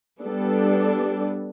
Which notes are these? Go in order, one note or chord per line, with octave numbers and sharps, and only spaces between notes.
G3 B3 D4 A4